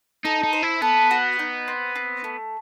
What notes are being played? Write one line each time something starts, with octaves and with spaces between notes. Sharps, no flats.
D#4 A4
D#4
C5
E4
B3 A4
F#4
D#4
C4
C4
A3